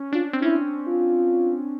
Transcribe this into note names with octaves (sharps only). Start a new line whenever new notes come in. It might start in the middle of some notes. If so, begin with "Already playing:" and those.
Already playing: C#4
D4 F4
C4
C#4 E4
F4